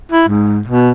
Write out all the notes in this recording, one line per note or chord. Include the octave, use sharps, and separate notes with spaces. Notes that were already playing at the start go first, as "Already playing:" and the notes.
E4
G#2
B2